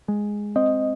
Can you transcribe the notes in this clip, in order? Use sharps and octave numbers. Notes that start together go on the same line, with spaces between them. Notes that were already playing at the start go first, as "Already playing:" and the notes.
G#3
C4 D#5